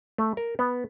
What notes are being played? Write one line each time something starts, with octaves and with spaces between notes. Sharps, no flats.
A3
A#4
B3